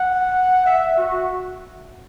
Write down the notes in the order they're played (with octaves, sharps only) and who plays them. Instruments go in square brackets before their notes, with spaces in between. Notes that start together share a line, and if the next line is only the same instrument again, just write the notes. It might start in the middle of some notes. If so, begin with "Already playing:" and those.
Already playing: [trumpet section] F#5
E5
F#4